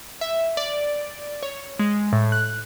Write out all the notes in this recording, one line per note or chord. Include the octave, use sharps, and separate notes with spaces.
E5
D5
C#5
G#3
A2
F#6